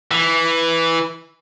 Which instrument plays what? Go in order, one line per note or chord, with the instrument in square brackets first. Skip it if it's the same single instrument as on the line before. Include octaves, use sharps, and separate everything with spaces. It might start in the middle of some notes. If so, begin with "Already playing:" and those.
[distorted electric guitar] E3